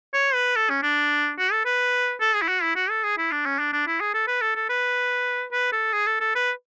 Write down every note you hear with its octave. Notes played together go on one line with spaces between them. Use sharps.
C#5
B4
A4
C#4
D4
F#4
A4
B4
A4
G#4
E4
F#4
E4
F#4
A4
G#4
E4
D4
C#4
D4
D4
E4
G#4
A4
B4
A4
A4
B4
B4
A4
G#4
A4
A4
B4